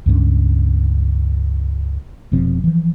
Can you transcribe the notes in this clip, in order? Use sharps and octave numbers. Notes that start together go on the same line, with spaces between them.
C#2 G2 F#3 C#4
F1 B2 F3 C4
E3 F3